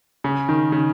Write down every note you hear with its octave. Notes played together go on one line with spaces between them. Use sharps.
C#3
D#3
C#3